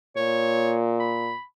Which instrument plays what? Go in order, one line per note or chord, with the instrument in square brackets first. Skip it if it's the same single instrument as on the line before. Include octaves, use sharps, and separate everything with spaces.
[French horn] A#2 [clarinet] C#5
[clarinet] B5